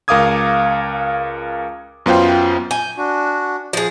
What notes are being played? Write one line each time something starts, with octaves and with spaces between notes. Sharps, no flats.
C#2 A#4 F5 D6 D#6 G#6
F#2 B3 F4 C5 G5
G#5 G6
D4 F#4
F3 G#4